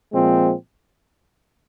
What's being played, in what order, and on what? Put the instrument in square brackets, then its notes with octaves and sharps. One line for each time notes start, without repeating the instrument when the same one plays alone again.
[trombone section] A#2 F3 G#3 C4